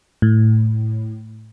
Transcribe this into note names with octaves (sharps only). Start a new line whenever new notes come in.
A2